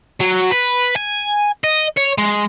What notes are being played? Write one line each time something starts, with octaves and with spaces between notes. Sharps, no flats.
F#3
B4
G#5
D#5
C#5
G#3